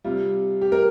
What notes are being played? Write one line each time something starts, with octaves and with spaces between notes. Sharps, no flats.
C3 G3 F4
G4
A#4